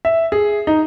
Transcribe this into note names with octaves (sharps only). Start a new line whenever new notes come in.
E5
G#4
D#4